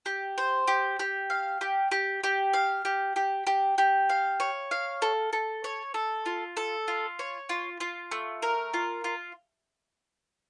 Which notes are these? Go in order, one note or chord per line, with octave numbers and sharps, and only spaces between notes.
G4
C5
G4
G4
F5
G4
G4
G4
F5
G4
G4
G4
G4
F5
C#5
F5
A4
A4
C#5
A4
F4
A4
F4
C#5
F4
F4
A3
A#4
F4
F4